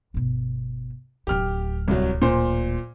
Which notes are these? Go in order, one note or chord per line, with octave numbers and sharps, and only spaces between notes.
G1 B2
D1 A3 G4 F6
C2 F#3
A#2 C5